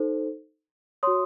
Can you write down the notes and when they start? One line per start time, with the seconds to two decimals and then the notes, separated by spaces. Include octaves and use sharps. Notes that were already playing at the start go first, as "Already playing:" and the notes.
Already playing: D#4 A4 C5
1.03 F#4 C#5 C6 D#6